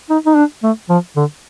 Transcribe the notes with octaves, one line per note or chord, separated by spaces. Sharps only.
D#4
D#4
D4
A3
F3
D3